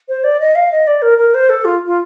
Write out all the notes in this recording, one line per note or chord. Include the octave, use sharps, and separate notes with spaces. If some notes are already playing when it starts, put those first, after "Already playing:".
C5
D5
D#5
F5
D#5
D5
A#4
A#4
C5
A4
F4
F4